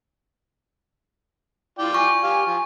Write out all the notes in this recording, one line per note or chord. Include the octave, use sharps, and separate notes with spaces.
E4 F4 D5 G5
G#5 C#6
G4 F5
F3